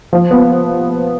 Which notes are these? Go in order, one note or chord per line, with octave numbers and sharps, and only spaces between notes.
F3
B3